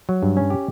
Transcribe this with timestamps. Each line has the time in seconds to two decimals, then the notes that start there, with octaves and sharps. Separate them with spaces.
0.09 F#3
0.23 G2
0.37 C#4
0.50 G4